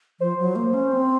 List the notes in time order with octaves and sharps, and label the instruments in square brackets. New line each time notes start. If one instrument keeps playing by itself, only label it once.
[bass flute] F3 [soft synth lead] C5
[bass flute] F#3
A#3
C#4
C4